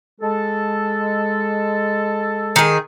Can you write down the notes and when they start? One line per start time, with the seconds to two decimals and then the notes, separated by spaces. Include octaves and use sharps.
0.21 G#3 A4
2.56 D#3 G#4